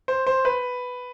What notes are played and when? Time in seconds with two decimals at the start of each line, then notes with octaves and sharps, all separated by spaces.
0.08 C5
0.27 C5
0.45 B4